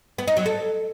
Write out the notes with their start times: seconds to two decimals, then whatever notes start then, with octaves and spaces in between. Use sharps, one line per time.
0.18 B3
0.28 D#4
0.37 F#3
0.46 A4